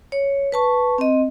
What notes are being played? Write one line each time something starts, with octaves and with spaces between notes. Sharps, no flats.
C#5
B4 A5 C#6
C4 D#5